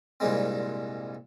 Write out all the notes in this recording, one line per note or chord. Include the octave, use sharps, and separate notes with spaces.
C2 G2 A#2 G3 G#3 C4